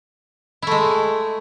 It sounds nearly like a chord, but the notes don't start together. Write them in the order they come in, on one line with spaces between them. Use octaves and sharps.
E4 A3 G#3